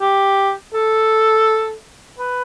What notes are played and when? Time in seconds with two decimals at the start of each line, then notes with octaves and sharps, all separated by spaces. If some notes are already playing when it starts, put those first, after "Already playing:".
0.01 G4
0.74 A4
2.18 B4